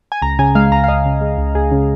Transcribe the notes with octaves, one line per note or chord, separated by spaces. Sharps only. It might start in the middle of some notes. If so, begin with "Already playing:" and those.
G#5
C#2 A#5
C#3 G#5
G#3 F5
C#2 A#5
F5
C#2 D#5
C#3
G#3
C#2
C#2 G#4
C#3